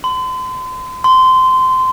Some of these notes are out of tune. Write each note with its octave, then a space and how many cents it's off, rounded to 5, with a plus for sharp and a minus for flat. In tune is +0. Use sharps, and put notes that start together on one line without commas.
C6 -40
C6 -20